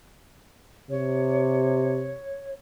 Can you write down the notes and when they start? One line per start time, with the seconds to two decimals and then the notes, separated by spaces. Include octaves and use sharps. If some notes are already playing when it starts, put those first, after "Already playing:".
0.91 C3 C#5